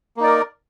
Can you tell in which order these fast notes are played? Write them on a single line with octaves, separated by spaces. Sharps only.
A#3 D#4 D5 A#4